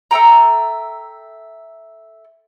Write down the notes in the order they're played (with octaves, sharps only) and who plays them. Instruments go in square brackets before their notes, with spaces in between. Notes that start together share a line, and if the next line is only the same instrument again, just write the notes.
[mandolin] A4 E5 G5 A#5